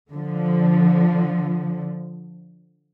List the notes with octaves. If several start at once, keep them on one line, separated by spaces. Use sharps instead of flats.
D3 F3